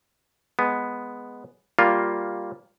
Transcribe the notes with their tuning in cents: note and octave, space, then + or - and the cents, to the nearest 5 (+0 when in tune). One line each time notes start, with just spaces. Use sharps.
G#3 +0 B3 +0
G3 +0 A#3 +0 F4 +0